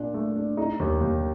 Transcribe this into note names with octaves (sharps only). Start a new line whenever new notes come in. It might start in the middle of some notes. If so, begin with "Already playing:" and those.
Already playing: A#2 D4
A3
D4
D#4
D#2
D#2